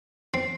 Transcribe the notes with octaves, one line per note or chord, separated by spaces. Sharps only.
C4